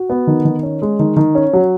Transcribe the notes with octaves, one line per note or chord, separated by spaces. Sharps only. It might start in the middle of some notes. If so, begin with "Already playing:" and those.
Already playing: F#4
B3
D#3
D#3
C#4
G#3
D#3
D#3
C#4
F#3